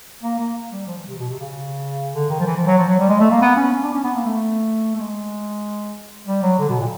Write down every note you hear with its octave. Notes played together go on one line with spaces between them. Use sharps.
A#3
A#3
G3
F3
E3
C3
B2
C3
C#3
D3
D#3
F3
E3
F3
F#3
F3
F#3
G3
G#3
A3
A#3
B3
C#4
C#4
D4
C#4
B3
A#3
A3
A3
G#3
G3
F#3
D3
B2
A#2